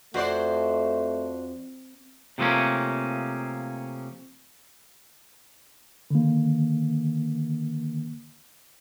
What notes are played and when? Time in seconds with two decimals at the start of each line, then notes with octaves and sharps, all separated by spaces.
0.14 F2 A3 F#4 C5 D5
2.38 C3 F3 A3 A#3 C#4
6.10 D3 D#3 A#3